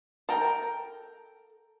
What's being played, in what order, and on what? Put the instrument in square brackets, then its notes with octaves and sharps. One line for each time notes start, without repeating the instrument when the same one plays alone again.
[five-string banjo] A4 A#4 G5